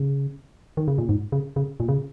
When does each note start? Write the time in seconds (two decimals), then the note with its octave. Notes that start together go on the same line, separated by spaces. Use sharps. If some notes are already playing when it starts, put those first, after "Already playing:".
Already playing: C#3
0.77 D#3
0.88 C#3
0.98 A#2
1.09 G#2
1.32 C#3
1.56 C#3
1.80 A#2
1.88 C#3